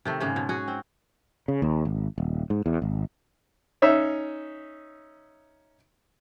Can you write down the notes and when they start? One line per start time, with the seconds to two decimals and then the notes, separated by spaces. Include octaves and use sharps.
0.05 C3 D#3 A3
0.20 G#2 C#3 G#3 A#3
0.36 B2
0.49 C#4 F#4 G#4
0.68 C4
1.48 C#3
1.62 D#2
1.85 G#1
2.18 D#1
2.50 G#2
2.66 E2
2.82 G#1
3.82 C#4 D#4 E5